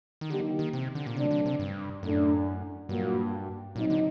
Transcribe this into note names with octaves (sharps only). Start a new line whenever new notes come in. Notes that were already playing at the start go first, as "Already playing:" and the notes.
D#3
D3 F#3 A#3 D#4 G4
D#3
C3
D3
A#2
C3 F#3 A3 D4
D3
C3
G2
F#2 A2 A3 D4
G2 A#2 F#3 A#3 F#4
A#2 F#3 C4 D#4
D3